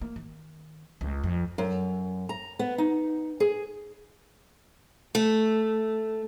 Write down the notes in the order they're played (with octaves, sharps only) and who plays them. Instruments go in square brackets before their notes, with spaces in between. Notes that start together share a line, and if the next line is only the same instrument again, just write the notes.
[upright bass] A#3
D#3
C#2
F2
[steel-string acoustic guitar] F#2
A#5
B3
D#4
G#4
A3